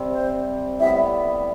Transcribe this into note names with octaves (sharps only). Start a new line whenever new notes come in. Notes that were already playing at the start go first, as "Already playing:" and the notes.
Already playing: C3 G3 C4
C5
A2 G3 B3 E5